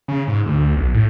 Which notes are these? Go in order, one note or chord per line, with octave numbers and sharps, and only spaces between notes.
C#3
G#2
D2
B1
A2